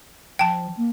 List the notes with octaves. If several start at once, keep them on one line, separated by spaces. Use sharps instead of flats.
F3 G5 A5
A#3